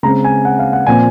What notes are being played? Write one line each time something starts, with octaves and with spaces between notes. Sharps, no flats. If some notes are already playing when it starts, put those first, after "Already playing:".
C#3 G#3 C4 A#5
G#5
F#5
F5
F#5
A#2 F3 C4 G#5